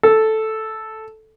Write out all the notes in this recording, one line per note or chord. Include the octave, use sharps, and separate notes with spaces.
A4